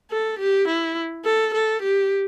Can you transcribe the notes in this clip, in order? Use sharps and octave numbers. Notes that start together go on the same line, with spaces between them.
A4
G4
E4
A4
A4
G4